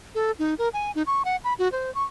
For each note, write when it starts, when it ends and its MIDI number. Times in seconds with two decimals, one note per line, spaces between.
0.15 0.32 69
0.39 0.54 63
0.58 0.69 70
0.73 0.91 80
0.95 1.03 63
1.07 1.23 85
1.25 1.36 78
1.44 1.53 83
1.59 1.71 66
1.72 1.93 72
1.95 2.04 85